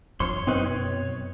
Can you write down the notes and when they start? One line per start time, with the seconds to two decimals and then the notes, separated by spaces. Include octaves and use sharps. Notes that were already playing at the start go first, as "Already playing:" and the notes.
0.20 G1 F2 F3 C#5 C6
0.47 F#2 B2 B3 C4 D#4 B4
0.65 C#5